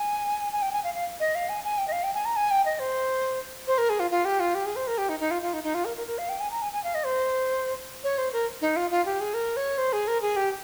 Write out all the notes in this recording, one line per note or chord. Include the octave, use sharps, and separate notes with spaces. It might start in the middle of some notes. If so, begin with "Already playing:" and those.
Already playing: G#5
G#5
G5
G#5
F5
F5
D#5
F5
G#5
G#5
G5
D#5
F5
G5
G#5
A#5
G#5
G5
D#5
C5
C5
A#4
G#4
F4
F4
G4
F4
G4
G#4
C5
A#4
G4
D#4
D#4
F4
F4
D#4
D#4
F4
A#4
A#4
A#4
F5
G5
G#5
A#5
G#5
G#5
F5
D#5
C5
C#5
C5
A#4
D#4
F4
F4
G4
G#4
A#4
C#5
C5
G#4
A#4
G#4
G4